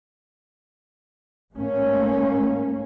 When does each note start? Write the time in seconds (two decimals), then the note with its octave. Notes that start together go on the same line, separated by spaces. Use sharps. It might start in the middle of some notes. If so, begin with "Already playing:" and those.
1.54 G#2 A3 A#3 C#4